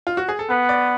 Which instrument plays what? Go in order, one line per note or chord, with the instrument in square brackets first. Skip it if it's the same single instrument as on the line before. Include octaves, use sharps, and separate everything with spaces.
[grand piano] F4
F#4
G#4
A4
[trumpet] B3 [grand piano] B4
[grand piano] D5